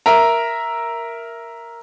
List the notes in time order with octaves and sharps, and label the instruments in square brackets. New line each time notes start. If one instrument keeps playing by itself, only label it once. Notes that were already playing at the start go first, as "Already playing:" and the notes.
[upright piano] A#4 E5 A#5